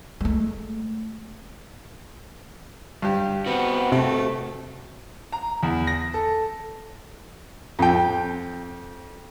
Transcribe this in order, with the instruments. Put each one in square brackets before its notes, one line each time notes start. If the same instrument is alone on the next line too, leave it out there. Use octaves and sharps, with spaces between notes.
[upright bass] G#3 A3
[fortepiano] G2 G4
[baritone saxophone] B3 [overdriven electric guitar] C4 F#4
[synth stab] C3 [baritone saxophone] A3
[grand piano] A#5
E2
A#6
A4
[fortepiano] F2 G5